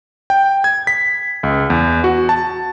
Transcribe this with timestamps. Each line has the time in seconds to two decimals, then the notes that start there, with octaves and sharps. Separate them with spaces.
0.30 G5
0.64 G#6
0.87 B6
1.43 C#2
1.70 E2
2.04 F#4
2.29 A5